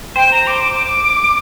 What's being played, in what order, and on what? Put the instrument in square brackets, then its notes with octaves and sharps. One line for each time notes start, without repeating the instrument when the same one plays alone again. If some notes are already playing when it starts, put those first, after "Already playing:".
[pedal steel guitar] C5 [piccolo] G5
[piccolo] A#5
D6
D6